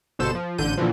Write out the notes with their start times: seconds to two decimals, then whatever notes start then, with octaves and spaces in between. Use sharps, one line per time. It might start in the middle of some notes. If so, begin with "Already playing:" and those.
0.19 G1 B2 A4 C5 E7
0.35 F3
0.58 A1 D3 G6 D#7
0.77 A#2 D3 E3 F3